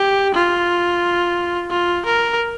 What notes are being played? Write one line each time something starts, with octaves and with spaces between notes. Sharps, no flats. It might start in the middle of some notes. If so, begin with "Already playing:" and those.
Already playing: G4
F4
F4
A#4